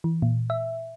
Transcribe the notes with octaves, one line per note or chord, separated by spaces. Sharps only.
E3
A#2
E5